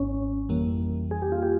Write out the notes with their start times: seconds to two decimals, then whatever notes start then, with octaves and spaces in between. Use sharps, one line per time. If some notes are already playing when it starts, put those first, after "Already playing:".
Already playing: G#1 G#2 C#4
0.49 F2 E3 G3 A#3
1.11 G#4
1.22 G4
1.32 F4
1.43 G4